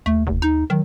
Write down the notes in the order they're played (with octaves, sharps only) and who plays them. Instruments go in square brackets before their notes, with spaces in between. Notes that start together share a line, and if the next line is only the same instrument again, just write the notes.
[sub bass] D#2 [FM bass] A3
[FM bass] F1
D#4
[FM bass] D#3 [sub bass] F#3